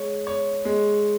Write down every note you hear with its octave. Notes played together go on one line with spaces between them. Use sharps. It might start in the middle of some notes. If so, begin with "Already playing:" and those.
Already playing: G#3 C#5
C#5
G#3